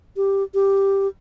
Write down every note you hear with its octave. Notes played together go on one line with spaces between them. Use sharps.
G4
G4